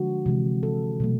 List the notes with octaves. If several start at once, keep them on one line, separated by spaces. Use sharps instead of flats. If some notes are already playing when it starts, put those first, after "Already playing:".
Already playing: D3 F3 G#3 F#4
C3 E3 G#3
A4
B2 F#3 A3